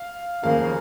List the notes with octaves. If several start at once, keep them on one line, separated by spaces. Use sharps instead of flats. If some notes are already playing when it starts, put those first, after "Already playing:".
Already playing: F5
D#2 C#3 F3 A#3 F5